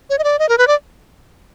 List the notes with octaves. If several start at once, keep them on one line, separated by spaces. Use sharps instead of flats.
C#5
D#5
D5
D#5
A#4
B4
D5